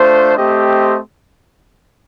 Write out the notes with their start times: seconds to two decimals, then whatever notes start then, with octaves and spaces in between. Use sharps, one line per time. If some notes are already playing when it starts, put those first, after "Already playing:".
Already playing: A3 D4 F4 C5
0.37 A3 C4 G4 C5 D#5